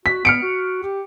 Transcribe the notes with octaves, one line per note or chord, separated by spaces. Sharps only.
F#4 B6
B3 F6 C#7 D7
F#4
G4